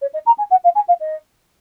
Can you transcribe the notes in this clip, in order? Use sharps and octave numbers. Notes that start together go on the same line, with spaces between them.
C#5
D#5
A#5
G#5
F#5
F5
G#5
F5
D#5